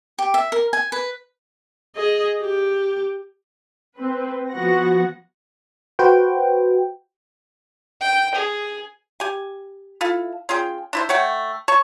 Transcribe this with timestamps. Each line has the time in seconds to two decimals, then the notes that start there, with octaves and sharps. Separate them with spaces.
0.18 G4
0.34 E5
0.52 A#4
0.73 G#5
0.92 B4
1.96 G#4 D#5
2.41 G4
3.97 C4 B4
4.51 F3 B3 F#4 F#5 A#6
5.99 F#4 B4 C5 G5
8.01 G5
8.35 G#4
9.20 G4 G#5
10.01 E4 F4 A4
10.49 C#4 F4 G#4 G5
10.93 D4 E4 C5
11.09 A3 C#5 F#5 G5
11.68 C#5 A5 C#6